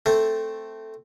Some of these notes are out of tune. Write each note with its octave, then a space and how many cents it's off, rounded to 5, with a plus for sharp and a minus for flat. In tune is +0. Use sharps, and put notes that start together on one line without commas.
A3 +0 C4 +0 A4 +0